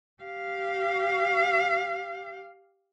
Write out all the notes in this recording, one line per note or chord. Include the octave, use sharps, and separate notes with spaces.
G4 F5